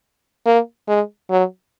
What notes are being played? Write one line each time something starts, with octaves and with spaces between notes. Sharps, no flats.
A#3
G#3
F#3